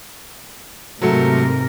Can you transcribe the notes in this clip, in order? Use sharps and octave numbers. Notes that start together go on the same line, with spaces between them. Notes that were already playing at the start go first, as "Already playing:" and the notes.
G#2 C3 F#3 A3 A#4